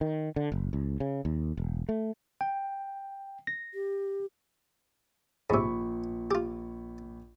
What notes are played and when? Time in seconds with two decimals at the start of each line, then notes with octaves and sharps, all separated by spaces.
0.01 D#3
0.36 D3
0.52 F#1
0.73 C#2
1.00 C#3
1.25 D#2
1.57 E1
1.89 A3
2.41 G5
3.47 A#6
3.74 G4
5.50 A#1 G#2 C3 B5 C#6
6.31 F4 G4